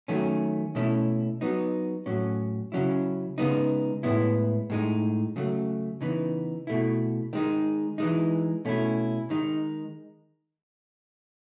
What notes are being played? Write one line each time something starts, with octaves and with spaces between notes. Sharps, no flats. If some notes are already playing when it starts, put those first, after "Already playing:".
D#3 F#3 A3 C#4
B2 A3 C#4 E4
F#3 B3 D#4
A2 F#3 C#4
C#3 F#3 C#4 E4
C#3 G#3 B3 D#4
A2 G#3 B3 E4
A2 G#3 D#4
C#3 F#3 A3
C#3 E3 B3 D#4
B2 A3 E4
D#3 G#3 D#4
E3 G#3 D#4
B2 A3 C#4 E4
D#3 G#3 D#4